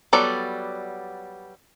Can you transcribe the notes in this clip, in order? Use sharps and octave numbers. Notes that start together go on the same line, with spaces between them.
F#3 G3 B3 A4 D5